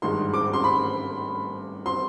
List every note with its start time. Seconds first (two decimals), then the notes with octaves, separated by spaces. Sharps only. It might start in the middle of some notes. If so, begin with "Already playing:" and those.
0.02 G#1 G2 D#3 G#3 C6
0.34 D6
0.53 C6
0.64 B5
1.86 C6